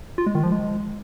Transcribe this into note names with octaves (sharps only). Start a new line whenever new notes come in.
F4
G#3
D#3
F3
G#3